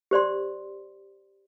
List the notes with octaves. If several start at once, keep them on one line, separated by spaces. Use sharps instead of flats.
G4 C5 D5 C6